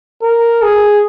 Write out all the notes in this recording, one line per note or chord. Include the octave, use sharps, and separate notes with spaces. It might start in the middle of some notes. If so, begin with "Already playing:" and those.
A#4
G#4